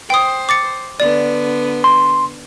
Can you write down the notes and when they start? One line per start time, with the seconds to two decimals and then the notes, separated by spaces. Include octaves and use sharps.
0.10 C5 G5 D#6
0.49 D6 A6 C#7
1.00 D3 B3 D5
1.84 C6